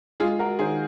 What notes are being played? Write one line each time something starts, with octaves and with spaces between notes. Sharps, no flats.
G#3 F4 G#4
F#4 A#4
D#3 G#4 C5